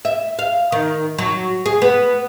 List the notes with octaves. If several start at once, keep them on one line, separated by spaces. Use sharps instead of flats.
E5
F5
D#3
F#3
G#4
B3